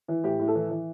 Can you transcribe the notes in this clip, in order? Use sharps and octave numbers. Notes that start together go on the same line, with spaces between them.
E3
A2 G4
A2
A4
E3
E3